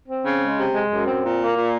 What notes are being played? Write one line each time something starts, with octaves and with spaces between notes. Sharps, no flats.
C4
C#3
G#3
C3
G#3
F#2
C4
A#2
A#3
A#2